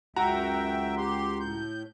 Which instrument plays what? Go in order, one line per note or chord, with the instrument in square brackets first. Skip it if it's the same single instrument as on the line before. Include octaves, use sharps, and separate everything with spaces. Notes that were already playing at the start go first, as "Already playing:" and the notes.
[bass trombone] C#2 [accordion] F#2 E5 G5 [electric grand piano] F#4 A#5
[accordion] G4 C6
A2 G6